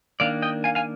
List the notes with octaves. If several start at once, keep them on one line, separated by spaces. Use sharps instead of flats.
D#3 A#3 D4 D5 F5
D#5 G5
F5 G#5
F5 G#5